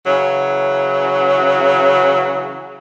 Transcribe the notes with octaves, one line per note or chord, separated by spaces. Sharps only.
C#3 E3 F#3